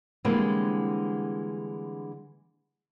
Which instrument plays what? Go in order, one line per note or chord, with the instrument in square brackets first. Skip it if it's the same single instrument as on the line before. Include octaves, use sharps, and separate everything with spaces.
[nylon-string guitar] D3 E3 G3 G#3 A#3 C4